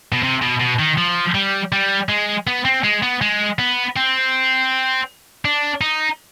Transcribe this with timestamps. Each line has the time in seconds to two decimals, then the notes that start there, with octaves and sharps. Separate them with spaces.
0.13 B2
0.23 C3
0.42 B2
0.60 B2
0.79 D#3
0.98 F3
1.35 G3
1.72 G3
2.09 G#3
2.47 B3
2.65 C4
2.84 G#3
3.03 B3
3.22 G#3
3.59 B3
3.96 C4
5.45 D4
5.81 D#4